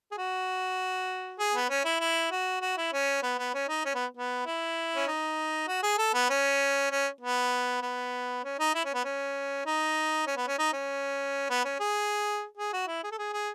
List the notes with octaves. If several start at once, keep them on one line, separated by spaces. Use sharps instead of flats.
G#4
F#4
G#4
B3
C#4
E4
E4
F#4
F#4
E4
C#4
B3
B3
C#4
D#4
C#4
B3
B3
E4
C#4
D#4
F#4
G#4
A4
B3
C#4
C#4
B3
B3
C#4
D#4
E4
C#4
B3
C#4
D#4
C#4
B3
C#4
D#4
C#4
B3
C#4
G#4
G#4
F#4
E4
G#4
A4
G#4
G#4